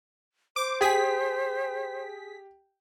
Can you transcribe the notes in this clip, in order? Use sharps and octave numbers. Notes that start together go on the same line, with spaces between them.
C5 D6
G4 G#4 B6